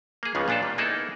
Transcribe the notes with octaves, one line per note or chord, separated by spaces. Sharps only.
A#3 G#4
C#2 C#3 F3 B3
A#2 B3 D4 F4 A4
D#3 G3
A#3 B3 D#4 E4 G#4 A4